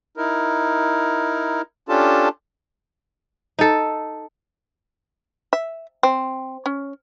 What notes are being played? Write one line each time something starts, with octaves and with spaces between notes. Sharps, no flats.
D#4 E4 A#4
C#4 D4 F4 G4 A4 A5
D#4 A4
E5
C4
C#4